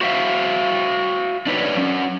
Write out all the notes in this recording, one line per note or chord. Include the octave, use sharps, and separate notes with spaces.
F#4 C5 E5 F5
D4 D#4 B4 C#5 D5
F#3 C#4